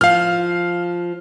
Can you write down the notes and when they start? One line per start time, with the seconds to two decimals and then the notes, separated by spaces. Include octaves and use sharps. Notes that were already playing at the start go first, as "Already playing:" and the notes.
0.01 F3 F5 F6